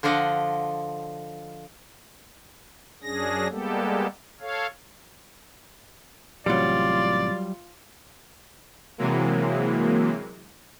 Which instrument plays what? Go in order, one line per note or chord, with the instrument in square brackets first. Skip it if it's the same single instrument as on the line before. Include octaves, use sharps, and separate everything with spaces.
[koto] D3 F3 F4 D5 D#5 F#5
[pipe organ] F#2 C#4 D4 G#4 A#6
G3 G#3 A#3 B3 G4 A4
A4 C#5 F5
[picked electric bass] A1 A2 C3 [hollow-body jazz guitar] F#3 G3 [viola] F4 [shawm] D5
[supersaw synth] C3 E3 F#3 G#3 A#3